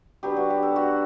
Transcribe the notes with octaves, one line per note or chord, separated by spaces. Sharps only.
F#3 B3 D4 G4
F#4
G4
A4
F#4